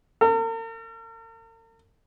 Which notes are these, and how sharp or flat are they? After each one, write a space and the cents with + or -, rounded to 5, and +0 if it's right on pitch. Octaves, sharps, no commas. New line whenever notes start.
A#4 -45